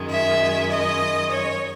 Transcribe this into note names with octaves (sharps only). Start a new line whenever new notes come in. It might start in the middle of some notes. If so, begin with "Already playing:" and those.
Already playing: F#2 D#3 G#3
E5
D#5
C#5